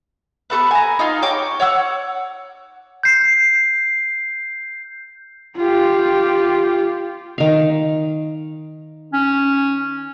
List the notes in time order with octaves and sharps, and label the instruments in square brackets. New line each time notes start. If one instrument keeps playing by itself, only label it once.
[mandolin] B3 F#4 A4 B4
G#5 A#5
D#4 F4
C#5 G5 D6
C#5 F#5 E6 F#6
[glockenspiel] G6 C7
[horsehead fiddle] F4 G4
[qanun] D#3 F5
[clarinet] C#4